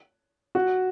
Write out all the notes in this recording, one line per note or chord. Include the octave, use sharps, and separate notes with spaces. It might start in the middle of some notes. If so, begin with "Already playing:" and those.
F#4